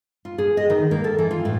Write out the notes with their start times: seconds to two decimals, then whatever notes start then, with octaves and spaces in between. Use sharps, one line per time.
0.25 F4
0.38 G#4
0.57 D#5
0.70 D#3
0.91 A#3
1.04 A4
1.19 E3
1.31 F4
1.45 A2